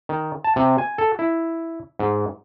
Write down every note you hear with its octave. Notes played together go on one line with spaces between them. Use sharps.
D#3
A5
C3
G#5
A4
E4
G#2